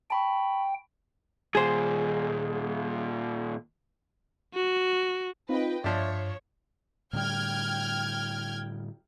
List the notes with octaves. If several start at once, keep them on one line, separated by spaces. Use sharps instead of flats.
G5 A5 B5 C#6
D#2 A#2 G#4 C5
F#4
C4 D#4 F4 B4 D#5 G5
G2 F3 D4 C#5 E5 B6 C7
A2 D3 G3 G5 F6 G#6